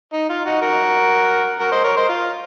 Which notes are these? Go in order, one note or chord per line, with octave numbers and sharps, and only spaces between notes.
D#4
F4
D#4 F#4
F#4 A#4
F#4 A#4
C5 D#5
A#4 C#5
C5 D#5
F4